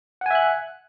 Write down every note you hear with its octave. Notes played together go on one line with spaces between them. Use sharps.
E5 F#5 G#5 F#6